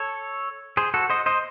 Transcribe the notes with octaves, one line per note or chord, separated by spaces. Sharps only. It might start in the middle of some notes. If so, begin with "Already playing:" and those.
Already playing: A4 C#5
G#4 C5
F#4 A4
C5 D#5
C5 D#5